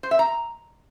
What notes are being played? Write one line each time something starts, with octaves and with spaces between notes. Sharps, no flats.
C5
E5
A#5